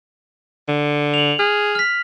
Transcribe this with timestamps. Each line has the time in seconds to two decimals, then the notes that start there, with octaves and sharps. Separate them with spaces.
0.68 D3
1.14 F7 F#7
1.39 G#4 F6
1.75 F6 B6